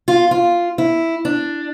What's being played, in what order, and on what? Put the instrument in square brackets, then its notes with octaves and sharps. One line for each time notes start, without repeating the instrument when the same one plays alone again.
[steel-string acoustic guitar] F4
F4
E4
D4